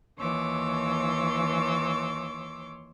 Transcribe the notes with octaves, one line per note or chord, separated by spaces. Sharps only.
D#2 E3 C#5 C6 D6 E6